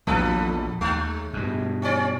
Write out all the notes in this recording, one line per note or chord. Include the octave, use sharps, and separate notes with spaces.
A#1 E2 F3 A4 B4
D#2 G#3
G2 B2
C4 C#4 D5